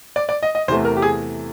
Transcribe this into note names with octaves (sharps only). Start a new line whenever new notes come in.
D5
D5
D#5
D#5
E2 C3 E3 A3 C5
A#4
G4
G#4